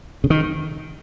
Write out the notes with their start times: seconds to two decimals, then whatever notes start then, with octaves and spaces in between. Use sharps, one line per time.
0.24 C#3
0.30 D#3